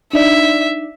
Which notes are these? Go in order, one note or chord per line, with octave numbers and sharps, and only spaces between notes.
D4 D#4 D5 E5